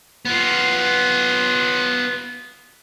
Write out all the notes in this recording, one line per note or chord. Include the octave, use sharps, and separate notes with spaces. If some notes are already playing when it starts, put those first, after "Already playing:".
B3 F4